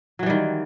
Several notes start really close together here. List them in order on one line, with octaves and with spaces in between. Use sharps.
F#3 E3 G3 D#3